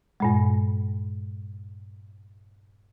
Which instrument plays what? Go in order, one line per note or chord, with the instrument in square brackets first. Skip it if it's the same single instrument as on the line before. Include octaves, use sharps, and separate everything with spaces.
[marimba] G2 A#2 G#3